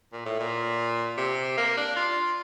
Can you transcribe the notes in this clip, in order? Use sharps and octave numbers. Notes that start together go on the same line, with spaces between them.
A#2
A2
A#2
C3
A#3
D4
F4